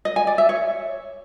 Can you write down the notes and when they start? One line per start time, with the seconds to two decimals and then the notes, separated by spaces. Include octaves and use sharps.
0.05 D#5
0.16 G#5
0.27 D5
0.38 E5
0.49 C#5